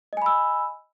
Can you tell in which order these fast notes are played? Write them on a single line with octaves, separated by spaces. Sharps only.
D#5 G#5 B5 E6